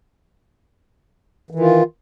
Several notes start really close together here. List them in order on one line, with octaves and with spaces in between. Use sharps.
E3 D#3 F4